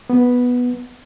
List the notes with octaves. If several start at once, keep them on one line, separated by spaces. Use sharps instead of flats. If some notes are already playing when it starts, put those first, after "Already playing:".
B3